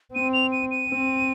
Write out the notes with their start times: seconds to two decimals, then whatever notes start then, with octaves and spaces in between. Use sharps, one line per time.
0.14 C4 D#7
0.33 F7
0.52 D#7
0.71 D#7
0.90 C4